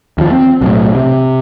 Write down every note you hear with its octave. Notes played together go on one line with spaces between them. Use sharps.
D#2 F3
C4
B1 A2
C3